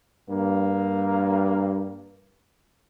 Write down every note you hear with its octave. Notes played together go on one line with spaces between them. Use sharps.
G2 A#3